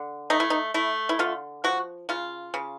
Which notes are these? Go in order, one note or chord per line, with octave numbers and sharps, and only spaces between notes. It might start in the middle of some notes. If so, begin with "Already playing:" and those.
Already playing: D3
A3 D#4
E4
D#4
A3 E4
E4
D3 F4
F3 F#4
C#3 F4
C#3